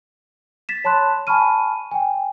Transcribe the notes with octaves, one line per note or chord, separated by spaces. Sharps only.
A6 B6 E7
C#5 A5 B5 C6 F#6
G#5 A5 B5 C#6 F6 D#7
G5 G#5